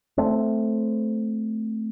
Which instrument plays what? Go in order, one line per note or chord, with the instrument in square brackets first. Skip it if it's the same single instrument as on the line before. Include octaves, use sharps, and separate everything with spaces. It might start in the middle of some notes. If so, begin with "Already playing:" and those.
[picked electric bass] A3 C4